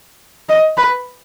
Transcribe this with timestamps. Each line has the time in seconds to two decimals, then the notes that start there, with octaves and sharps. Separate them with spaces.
0.49 D#5
0.77 B4